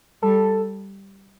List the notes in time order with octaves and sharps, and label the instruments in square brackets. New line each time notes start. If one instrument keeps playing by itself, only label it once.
[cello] G3 [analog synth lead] A4